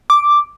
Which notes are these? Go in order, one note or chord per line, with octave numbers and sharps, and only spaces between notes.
D6